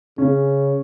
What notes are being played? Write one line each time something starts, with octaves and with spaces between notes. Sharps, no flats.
C#3 C#4